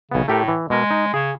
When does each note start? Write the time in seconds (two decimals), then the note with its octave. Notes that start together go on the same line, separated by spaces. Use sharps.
0.12 B1 C#3 B3
0.28 A2 A3 G4 A#4
0.48 E3
0.70 B2 G#3 A#4
0.91 D#4
1.14 C#3 G#4